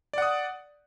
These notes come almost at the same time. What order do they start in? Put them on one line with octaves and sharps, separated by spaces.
D5 F#5 D#6